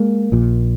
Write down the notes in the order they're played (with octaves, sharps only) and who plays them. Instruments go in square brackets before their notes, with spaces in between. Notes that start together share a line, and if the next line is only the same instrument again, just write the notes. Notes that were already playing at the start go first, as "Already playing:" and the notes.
Already playing: [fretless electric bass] G#3 A#3
A#1 A#2